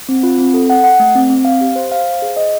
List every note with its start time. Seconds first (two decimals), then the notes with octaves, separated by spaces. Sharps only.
0.09 C4
0.23 F4
0.38 C4
0.54 A4
0.70 F#5
0.84 F#5
1.00 A3
1.15 C4
1.30 C4
1.45 F5
1.61 G4
1.76 C5
1.92 F5
2.06 C5
2.22 G#4
2.36 D#5